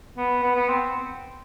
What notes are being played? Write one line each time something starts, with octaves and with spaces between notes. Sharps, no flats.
B3
B3
B3
C4